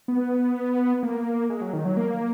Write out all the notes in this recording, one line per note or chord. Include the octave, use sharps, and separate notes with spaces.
B3
A#3
G#3
F#3
D#3
F#3
A#3